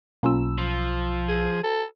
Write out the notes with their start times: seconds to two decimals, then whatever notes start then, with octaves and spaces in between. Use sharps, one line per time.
0.23 B1 A#3 C#4 F4 E6
0.58 F3
1.28 G#4
1.63 A4